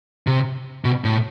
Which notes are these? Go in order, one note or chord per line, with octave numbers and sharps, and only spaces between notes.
C3
B2
A2